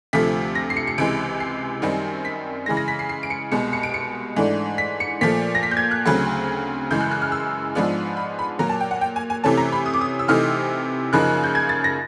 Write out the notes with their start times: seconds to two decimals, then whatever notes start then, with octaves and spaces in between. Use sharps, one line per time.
0.13 D2 C3 F3 A3 B6
0.55 A#6
0.70 C7
0.76 C#7
0.87 C#7
0.98 C#2 C3 E3 G#3 D7
1.40 C7
1.82 F#2 D#3 G3 C4 D#4
2.25 B6
2.66 C#3 E3 G#3 A#6
2.77 A#6
2.88 B6
2.99 C7
3.09 C7
3.23 D7
3.30 C#7
3.52 C2 B2 G#3 C#7
3.73 C#7
3.83 D7
3.94 C#7
4.37 G#2 E3 A3 D4
4.78 B6
5.00 C#7
5.21 A#2 F3 A3 B6
5.55 A#6
5.63 B6
5.71 G6
5.77 G#6
5.91 F#6
6.05 D2 C#3 F#3 A3 C4
6.91 F#2 C#3 E3 G#3 G6
7.01 F#6
7.11 F#6
7.22 F6
7.32 E6
7.75 G#2 F3 G#3 B3 D4
8.17 B5
8.39 B5
8.59 A#2 F#3 A#3 A#5
8.69 A5
8.81 G5
8.91 F#5
9.01 G5
9.16 G#5
9.30 G#5
9.44 C3 E3 A3 C#4 A5
9.57 A#5
9.72 B5
9.86 D#6
9.93 D6
10.01 D#6
10.19 E6
10.28 C3 E3 A3 C4 D#4 F6
11.13 F#2 C#3 F3 A#3 D#4 F#6
11.44 G6
11.55 G#6
11.69 A6
11.84 A#6